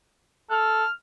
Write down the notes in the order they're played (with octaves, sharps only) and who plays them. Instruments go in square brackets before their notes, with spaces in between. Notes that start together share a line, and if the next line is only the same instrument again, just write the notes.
[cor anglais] A4 [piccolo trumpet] F6